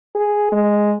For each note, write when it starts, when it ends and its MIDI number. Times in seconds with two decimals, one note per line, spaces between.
0.15 0.50 68
0.52 0.95 56